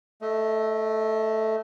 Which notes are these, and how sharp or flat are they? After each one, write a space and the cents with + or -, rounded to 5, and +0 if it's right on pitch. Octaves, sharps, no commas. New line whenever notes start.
A3 +0 D#5 +25